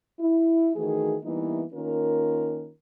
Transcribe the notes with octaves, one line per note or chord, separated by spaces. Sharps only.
E4
D#3 E3 A3 F#4 G#4
E3 G3 A#3 B3 D#4 E4
D#3 A#3 C#4 F4 A#4